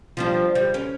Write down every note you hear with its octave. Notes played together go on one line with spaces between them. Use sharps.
F3 G3 D4
G3
C#4